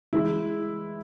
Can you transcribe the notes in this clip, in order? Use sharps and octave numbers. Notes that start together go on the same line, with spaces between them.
E3 G#3 E4